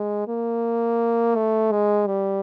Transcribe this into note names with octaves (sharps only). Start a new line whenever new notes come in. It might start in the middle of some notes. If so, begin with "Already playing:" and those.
Already playing: G#3
A#3
A3
G#3
G3